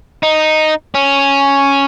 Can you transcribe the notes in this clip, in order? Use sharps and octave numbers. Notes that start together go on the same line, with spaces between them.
D#4
C#4